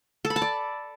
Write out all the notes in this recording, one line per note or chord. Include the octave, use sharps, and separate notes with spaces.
A4
B5
A5
D5